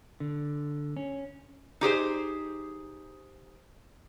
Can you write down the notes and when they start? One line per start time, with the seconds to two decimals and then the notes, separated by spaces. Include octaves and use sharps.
0.20 D3
0.97 C#4
1.81 D#4 G4 G#4 C5